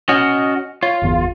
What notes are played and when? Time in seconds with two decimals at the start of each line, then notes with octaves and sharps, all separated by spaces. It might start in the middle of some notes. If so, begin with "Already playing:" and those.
0.09 C#4 F#4 D#5 F6
0.83 F4 C#5
1.02 G1 E2